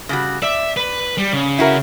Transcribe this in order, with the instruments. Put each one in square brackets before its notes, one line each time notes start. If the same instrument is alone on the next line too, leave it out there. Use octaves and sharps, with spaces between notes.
[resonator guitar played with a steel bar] C#3 G3 F#4
[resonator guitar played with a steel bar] D5 [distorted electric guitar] E5
[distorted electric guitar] B4
G3
C#3
[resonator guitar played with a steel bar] E4 F#4 A#4